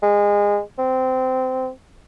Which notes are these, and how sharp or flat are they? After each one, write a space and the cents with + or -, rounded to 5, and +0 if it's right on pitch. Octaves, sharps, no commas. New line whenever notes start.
G#3 -25
C4 -20